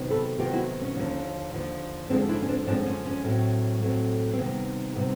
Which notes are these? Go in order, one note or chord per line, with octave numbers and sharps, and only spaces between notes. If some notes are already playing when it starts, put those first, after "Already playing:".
Already playing: C3 D#3 F#3 B3
A4 B4
C3 D#3 F#3 B3 F4 G4
E4 F#4
C#4
D#2 D3 F3 A#3
D#2 D3 F3 A#3
F#2 D3 F3 G#3 C4 D4
D4 E4
C#4
C4 D4
F#2 D3 F3 G#3 C4 D4
C#4
C#4
A2 F#3 A3 C4
A2 F#3 A3 C4
C4
C3 D#3 G3 B3 C#4
C3 D#3 G3 B3